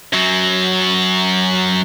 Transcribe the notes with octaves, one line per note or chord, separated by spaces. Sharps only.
F#2 F#3